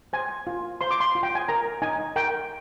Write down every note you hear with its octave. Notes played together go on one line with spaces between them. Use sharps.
C5 G#5
F4
C5 C6
D6
C6
F4
G5
G#5
A#4 A#5
D#4 G#5
A#4 G5